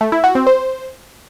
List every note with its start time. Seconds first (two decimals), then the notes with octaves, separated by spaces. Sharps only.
0.01 A3
0.12 E4
0.24 F#4
0.35 C4
0.47 C5